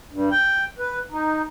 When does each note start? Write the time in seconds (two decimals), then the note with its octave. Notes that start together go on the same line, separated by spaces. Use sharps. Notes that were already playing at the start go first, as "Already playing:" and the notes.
0.12 G2
0.31 G5
0.79 B4
1.12 D#4